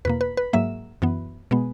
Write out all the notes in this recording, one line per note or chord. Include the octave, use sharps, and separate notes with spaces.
E2 B2 A#3 B4
B4
B4
G#2 F#3 A#3 E5
F#2 E3 B3
B2 G#3 B3